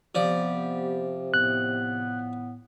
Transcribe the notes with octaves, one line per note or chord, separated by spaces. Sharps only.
C3 F3 B3 G4 D5
A2 B3 F#6